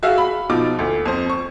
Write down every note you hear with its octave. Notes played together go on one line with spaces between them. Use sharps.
F#4 G#4 E5 F5
B5
B2 F3 D#4 D6
D2
F2 C5
C#6